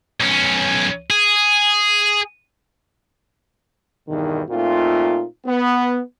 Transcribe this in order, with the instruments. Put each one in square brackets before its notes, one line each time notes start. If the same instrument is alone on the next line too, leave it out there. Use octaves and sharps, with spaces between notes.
[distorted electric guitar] B1 C#4
G#4
[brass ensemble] E2 G2 B2 D#3
A#2 A3 C4 D#4 F4
B3